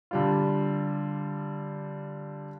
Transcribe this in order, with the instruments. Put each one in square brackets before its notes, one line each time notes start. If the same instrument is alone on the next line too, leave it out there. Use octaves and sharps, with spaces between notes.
[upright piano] D3 G3 F4